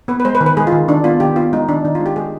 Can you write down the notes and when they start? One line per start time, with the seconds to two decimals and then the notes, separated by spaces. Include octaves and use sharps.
0.08 B3 B4
0.20 B4
0.25 G#3 C5
0.35 B4
0.41 D#3
0.46 B4
0.57 G#3 G#4
0.67 F4
0.72 D#3
0.88 D#3 D4
1.04 B3 F4
1.20 D#3 G4
1.36 B3 F4
1.53 G#3 D#4
1.69 D#3 D4
1.85 D#3 D#4
1.95 F4
2.00 G#3
2.06 G4
2.16 G#3 G#4